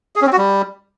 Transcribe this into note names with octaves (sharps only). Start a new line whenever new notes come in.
G#4
C#4
C4
F#4
G3